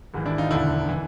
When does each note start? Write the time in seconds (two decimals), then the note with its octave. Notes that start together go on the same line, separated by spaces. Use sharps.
0.14 G#1 G#2 E3
0.26 D4 E4
0.38 D#4 F4
0.51 E1 D2 D3 D4 E4
0.89 E3